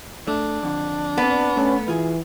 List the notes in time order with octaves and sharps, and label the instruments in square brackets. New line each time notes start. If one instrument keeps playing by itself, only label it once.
[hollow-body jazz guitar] A3 [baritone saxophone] D4
[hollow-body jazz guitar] F2 D3
[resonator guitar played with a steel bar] B3 [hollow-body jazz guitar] C4 D5
[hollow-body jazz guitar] A3 [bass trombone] C#4
[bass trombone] E3 [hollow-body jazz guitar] F4 G#4